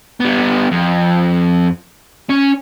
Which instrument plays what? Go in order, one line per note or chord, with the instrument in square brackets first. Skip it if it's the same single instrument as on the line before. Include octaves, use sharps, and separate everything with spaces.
[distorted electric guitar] G3 B3
F2
C#4